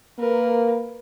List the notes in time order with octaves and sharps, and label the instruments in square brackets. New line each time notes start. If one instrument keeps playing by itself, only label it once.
[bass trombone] A#3 [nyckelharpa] A#4 B4